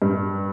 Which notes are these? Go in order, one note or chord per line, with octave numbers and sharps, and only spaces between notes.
G2